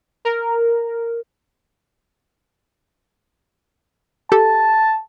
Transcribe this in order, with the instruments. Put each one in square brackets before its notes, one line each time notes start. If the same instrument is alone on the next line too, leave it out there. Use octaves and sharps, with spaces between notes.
[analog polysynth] A#4
[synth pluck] G4 A4 [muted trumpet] A5